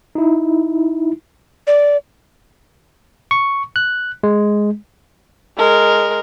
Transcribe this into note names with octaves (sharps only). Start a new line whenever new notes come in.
D#4 E4
D5
C#6
F#6
G#3
G#3 A#4